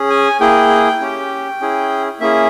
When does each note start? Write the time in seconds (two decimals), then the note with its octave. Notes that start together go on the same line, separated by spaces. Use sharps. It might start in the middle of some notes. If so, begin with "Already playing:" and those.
Already playing: C#4 G#4
0.10 G#5
0.40 A#3 E4 G#4 G5
1.01 C#4 G4
1.61 C#4 E4 G#4
2.20 A#3 C#4 E4 G#4 E5